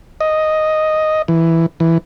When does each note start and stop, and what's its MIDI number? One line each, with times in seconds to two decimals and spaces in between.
0.21 1.22 75
1.28 1.66 52
1.80 1.98 52